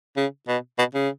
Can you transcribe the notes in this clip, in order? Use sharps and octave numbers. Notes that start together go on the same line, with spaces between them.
C#3
B2
B2
C#3